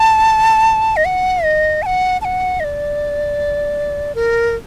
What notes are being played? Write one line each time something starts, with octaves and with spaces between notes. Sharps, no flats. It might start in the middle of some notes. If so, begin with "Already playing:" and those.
Already playing: A5
D#5
F#5
D#5
A5
F#5
A5
F#5
D#5
D5
A#4